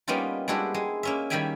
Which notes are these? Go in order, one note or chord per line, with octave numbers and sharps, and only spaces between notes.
G3 A#3 B3 C#4 D#4 F4
G3 G#3 D4 E4 F#4 G4
G#3
A#3 C#4 E5
D#3 G3 E4 E5 G5 G#5